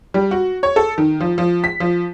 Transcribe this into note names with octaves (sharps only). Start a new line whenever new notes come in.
G3
F#4
C#5
A4
D#3
F3
F3
B6
F3